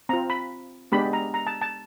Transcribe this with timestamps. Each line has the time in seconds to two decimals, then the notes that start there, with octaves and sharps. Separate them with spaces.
0.09 C4 A#5
0.13 F4
0.30 B5
0.92 G#3 B3 D4 G4 B5
1.13 A#5
1.34 A#5
1.47 A5
1.61 A5